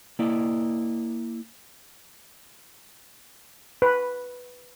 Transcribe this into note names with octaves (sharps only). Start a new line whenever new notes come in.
A#3 E4 D5 D#5
B4